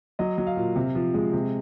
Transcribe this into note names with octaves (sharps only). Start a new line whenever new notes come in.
F#3 D#5
F#3
F5
A#2
C3
F3
G#3
C3